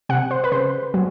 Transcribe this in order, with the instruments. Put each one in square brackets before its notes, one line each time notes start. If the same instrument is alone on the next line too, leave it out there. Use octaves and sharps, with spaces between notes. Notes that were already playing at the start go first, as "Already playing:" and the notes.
[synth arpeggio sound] C3 F#5
C5
B4
C#3 C5
F#3